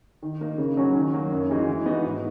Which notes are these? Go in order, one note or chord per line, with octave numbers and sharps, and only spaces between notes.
D#3
A#3 D#4
C#3
F#3 C#4 F#4
D#3
F#3 A#3
F#2
E3 G#3 D#4 F#4
E3
B3 D#4 F#4
G#2